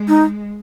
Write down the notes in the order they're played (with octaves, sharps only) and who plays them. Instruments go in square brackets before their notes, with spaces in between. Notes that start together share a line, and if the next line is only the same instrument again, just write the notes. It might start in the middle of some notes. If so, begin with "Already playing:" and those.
Already playing: [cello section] G#3
[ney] D#4